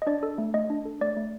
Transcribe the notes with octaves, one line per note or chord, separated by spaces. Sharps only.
D#5
D4 D5
A4
A3
A3 D#5
D4
A4
A3 D5
A3